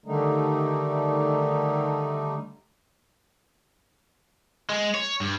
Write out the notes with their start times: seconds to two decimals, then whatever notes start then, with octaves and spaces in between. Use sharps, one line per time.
0.06 D3 D#3 G3 A3 D#4
4.70 G#3
4.95 C#5
5.21 G2